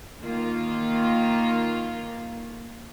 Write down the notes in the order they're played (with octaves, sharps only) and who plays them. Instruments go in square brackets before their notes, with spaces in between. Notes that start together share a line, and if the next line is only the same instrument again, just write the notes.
[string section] D#3 A#3 F4